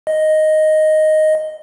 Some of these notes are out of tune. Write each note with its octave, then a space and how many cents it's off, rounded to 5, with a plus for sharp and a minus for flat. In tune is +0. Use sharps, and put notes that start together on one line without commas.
D#5 +0